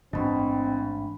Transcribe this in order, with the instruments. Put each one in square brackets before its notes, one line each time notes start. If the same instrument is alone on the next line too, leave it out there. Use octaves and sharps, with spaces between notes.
[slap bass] A1 G#2 [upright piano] B2 [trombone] C4 [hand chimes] D4 B5